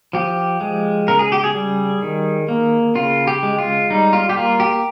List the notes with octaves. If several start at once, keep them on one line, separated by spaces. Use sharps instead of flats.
F3 G4
G#3
C#3 A#4
G#4
G4
G#4
G3
D#3
A#3
C#3 F4
G4
G#3
F4
G3 D#4
F4
G4
A#3 F4
G4